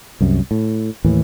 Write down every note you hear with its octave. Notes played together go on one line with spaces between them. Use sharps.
C2 F#2
A2
D#2 A2 E3